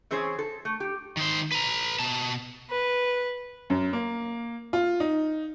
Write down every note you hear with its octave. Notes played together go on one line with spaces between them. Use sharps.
E3 C4 C#4 G#4 C5
A4
A3
G4
D#3 C5
B4 A#5
B2 A5
B4
F#2
A#3
F4
D#4